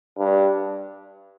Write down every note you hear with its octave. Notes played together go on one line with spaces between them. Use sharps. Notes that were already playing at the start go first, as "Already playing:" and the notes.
G2